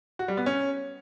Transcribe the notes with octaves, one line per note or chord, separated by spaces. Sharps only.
F#4
G3
B3
C#4